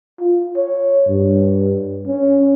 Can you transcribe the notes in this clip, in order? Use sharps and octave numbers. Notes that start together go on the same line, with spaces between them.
F4
C#5
G2
C#4